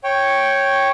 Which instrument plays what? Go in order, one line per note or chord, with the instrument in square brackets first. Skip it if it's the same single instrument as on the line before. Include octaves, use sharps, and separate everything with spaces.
[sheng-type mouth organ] C#5 G5